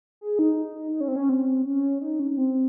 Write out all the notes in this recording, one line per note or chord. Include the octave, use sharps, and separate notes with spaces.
G#4
D#4
D#4
C#4
C4
C#4
C4
C#4
D#4
C#4
C#4
C4